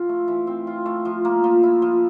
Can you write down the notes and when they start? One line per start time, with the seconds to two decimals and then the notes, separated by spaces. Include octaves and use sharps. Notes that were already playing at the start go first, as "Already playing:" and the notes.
Already playing: F3 C4 F4
0.09 A3
0.28 E3
0.47 C4
0.67 F4
0.86 A3
1.05 F3
1.25 A#3
1.44 F3
1.63 E4
1.82 F3